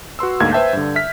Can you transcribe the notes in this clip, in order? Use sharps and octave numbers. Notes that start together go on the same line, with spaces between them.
F#4 B4 C6 E6
D2 G#2 A#3 F5 G#6
B4 C5 E5 G5 A5 G6
G2 D3
E5 F6 B6